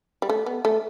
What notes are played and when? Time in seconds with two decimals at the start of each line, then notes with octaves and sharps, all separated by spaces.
0.22 G3
0.29 A3
0.46 B3
0.65 A3